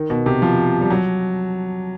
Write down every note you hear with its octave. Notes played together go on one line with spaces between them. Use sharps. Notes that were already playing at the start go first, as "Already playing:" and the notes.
Already playing: D#3
B2
C3
F3
G3
F#3